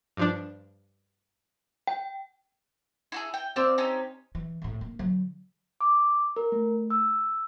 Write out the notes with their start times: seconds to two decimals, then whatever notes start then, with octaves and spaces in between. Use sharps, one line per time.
0.17 G2 F3 D4
1.87 G5
3.12 E4 F#4 G#4
3.34 G5
3.56 C4 F4 C5 D5 E6
3.78 C#4 D#4 G4
4.35 E3
4.62 C2 A2
4.81 A#3
4.99 D3 F#3
5.81 D6
6.37 A#4
6.52 A3
6.90 E6